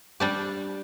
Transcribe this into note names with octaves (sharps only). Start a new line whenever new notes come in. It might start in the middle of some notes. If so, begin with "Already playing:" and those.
G3 D4 G4